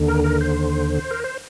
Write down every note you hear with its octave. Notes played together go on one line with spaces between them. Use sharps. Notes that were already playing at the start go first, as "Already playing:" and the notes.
Already playing: D#2 D3
A#4
A#4
C5
A#4
C5